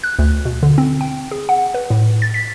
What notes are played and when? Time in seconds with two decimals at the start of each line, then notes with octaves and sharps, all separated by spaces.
0.04 F#6
0.19 D2
0.45 B2
0.63 D3
0.78 C4
1.01 G5
1.31 G#4
1.49 F#5
1.74 B4
1.90 A2
2.22 A6
2.34 B6